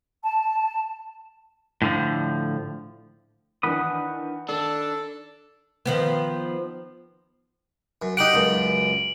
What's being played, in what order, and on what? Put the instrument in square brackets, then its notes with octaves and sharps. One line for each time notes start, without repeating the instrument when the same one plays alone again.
[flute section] A5
[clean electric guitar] A2 D3 F3
[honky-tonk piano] D#3 E3 D4 [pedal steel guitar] F#5 B5 D#6
[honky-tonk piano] D#3 [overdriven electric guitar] D4 [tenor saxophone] A4
[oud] D#3 F3 B3
[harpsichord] F#2
[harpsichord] D#4 G4 F#5 [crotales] D7 F#7
[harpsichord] C#2 F#2